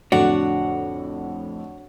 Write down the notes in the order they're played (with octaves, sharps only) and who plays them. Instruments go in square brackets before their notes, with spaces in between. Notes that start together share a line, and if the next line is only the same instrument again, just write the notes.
[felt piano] F2 A2 D3 [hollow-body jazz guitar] D4 [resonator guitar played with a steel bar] F#4 [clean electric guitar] C#5 F#5